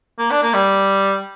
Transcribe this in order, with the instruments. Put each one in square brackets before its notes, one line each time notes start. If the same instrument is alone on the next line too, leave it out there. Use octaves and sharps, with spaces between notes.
[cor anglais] A#3
D4
A#3
G3